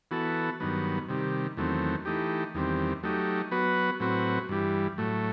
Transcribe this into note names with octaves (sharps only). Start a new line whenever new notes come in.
E3 B3 F#4 A4
G2 D#3 F#3 B3
C3 D#3 G3
E2 D#3 F#3 A3 C4
E3 A3 D#4 G4
E2 D#3 G3 C4
F#3 A3 D#4 G4
F#3 B3 F#4 B4
A2 F#3 C4 F#4 B4
G2 E3 G3
A2 F#3 A3